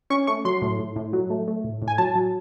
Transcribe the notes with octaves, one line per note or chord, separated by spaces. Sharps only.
C#4 C#6
A3 C#6
F#3 C6
A2
A2
A2
F#3
A3
A3
A2
A2
G#5
F#3 A5
F#3